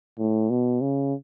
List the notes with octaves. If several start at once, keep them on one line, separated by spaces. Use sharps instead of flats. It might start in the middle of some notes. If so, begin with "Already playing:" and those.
A2
B2
C#3